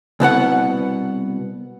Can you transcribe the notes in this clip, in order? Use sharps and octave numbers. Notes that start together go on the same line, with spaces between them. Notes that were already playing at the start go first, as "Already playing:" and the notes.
C2 B2 B3 F#5